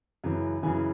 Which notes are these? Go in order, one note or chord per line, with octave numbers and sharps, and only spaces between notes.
F#2 C#3 E3
F#2 C#3 E3 G#5